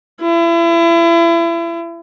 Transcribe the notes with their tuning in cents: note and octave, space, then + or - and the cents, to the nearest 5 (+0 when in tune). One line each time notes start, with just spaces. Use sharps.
E4 +35